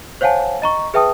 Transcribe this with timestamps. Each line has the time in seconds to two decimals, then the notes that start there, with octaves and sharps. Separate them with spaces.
0.21 C5 C#5 F5 F#5 G#5 A5
0.62 D#5 A#5 C#6
0.94 G#4 B4 E5 G5 A5 D#6